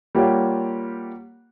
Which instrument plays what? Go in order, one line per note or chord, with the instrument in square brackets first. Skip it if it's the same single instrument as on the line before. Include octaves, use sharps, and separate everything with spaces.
[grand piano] G3 A#3 F4 G4 C#5 F#5